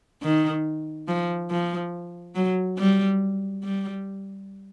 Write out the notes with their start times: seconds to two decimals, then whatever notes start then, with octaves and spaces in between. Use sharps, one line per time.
0.23 D#3
1.08 F3
1.51 F3
2.35 F#3
2.78 G3
3.63 G3